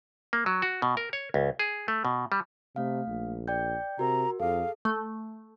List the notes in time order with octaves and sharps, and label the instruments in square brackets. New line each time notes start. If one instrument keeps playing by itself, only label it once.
[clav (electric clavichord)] A#3
F#3
F#4
B2
A#4
C#5
C#2
G#4
A3
B2
G3
[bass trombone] C3 [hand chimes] A3 F5
[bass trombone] A#1
[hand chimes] D5 G5 G6
[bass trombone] C3 [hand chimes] F#4 A#4 [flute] A#5
[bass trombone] F2 [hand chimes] G#4 A4 [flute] F5
[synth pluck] A3